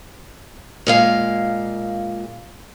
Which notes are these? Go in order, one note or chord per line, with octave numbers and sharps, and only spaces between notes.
A#2 G#3 F5